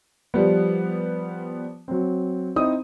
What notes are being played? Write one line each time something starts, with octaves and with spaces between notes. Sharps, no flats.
F3 G3 B3
F#3 C4
C4 D#4 E4 D#6